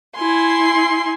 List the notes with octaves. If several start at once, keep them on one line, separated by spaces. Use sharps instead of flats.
E4 G#5 C6